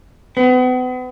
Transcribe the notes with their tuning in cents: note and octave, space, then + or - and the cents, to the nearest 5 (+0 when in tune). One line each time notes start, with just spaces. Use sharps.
B3 +40